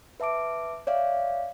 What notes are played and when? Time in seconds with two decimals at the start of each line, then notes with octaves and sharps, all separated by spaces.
0.20 B4 E5 A5 D6 D7
0.87 C#5 D5 E5 F5